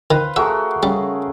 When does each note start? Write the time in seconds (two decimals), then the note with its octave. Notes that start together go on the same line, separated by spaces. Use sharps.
0.11 D#3 B4 C5 F5
0.36 A3 F#4 G#4 A#4 E5
0.83 C#3 G3